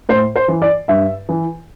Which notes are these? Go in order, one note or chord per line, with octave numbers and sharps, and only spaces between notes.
A2 C5
C5
E3
D5
G2 E5
E3